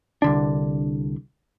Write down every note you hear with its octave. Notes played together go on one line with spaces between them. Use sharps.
C2 D3 D4